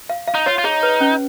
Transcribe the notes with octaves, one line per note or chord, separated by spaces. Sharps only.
F5
F5
D#4
F4 C#5
F4
D#4 G#4
B4
C#4